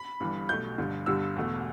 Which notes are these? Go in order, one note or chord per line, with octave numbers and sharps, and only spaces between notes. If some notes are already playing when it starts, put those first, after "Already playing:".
Already playing: B5
G1 G2 E3 G3
B1 B2 A3 G6
G1 G2 D3
G1 G2 D3 G3 E6
E1 E2 B2 A3